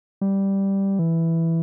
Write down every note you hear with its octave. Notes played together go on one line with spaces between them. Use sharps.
G3
E3